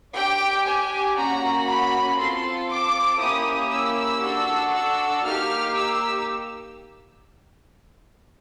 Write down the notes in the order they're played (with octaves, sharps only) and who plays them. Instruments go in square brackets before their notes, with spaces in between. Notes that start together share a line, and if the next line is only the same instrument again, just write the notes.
[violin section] D4 G4 G5
G#5
A#3 C#4 F#4 A#5
B5
C4 F4 A4 C6
D6
A#3 C#4 E4 G4 D#6
E6
D4 F#4 A4
E6
A#3 D#4 G4 F6
E6